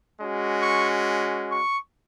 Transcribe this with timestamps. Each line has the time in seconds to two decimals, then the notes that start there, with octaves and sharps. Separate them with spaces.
0.18 G#3 C#4 F#4
0.62 C#6
1.52 C#6